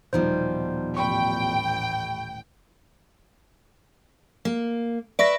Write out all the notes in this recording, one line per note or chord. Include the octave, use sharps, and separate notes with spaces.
D#1 B2 F3 G3 D#4 C5
A1 G5 B5 C#6
A#3
B4 D5 E5 C#6 A#6